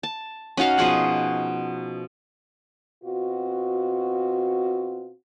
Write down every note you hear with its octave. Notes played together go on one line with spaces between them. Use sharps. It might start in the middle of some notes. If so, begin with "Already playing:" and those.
A5
C#4 D#4 F#4 F5
B2 F3 G#4 F#5
B2 C4 F4 F#4